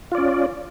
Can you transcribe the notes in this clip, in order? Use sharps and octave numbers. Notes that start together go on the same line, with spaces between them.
C#4 F4 D5